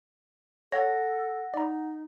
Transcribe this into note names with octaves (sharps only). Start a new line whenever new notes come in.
A4 C#5 F#5 A#6
D#4 D5 A#5